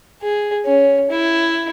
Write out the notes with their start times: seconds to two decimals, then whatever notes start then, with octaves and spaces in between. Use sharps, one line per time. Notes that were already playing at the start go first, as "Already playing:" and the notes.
0.22 G#4
0.66 C#4
1.11 E4